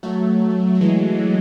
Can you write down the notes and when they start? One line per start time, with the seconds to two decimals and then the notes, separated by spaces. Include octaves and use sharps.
0.03 F#3 A3
0.75 A3
0.81 E3 G#3